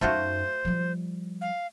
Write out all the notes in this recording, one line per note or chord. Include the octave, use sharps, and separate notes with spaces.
F#2 A3 D#4 F4 F#4 C5
F3 G3
F5